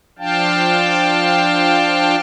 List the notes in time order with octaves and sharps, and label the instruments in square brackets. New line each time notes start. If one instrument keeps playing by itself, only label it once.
[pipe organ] F3 D4 F5 G5 A5